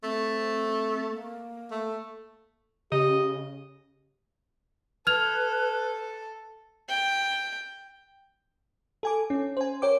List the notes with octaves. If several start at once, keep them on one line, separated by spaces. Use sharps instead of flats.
A3 C4
A#3
A3
C#3 G4 D#5
A4 B4 F6 G#6 F7
G5
A4 G#5 D6
C#4
C5 G#5
A#4 C#5 G5 D6